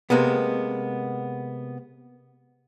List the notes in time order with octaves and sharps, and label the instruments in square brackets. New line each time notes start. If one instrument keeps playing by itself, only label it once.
[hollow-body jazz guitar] C3 G#3 A#3 B3